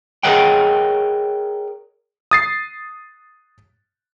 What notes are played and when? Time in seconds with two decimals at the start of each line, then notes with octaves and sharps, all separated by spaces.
0.23 G#4 A#4 C#5 D#5 F#5 G5
2.31 D#6 A6 C7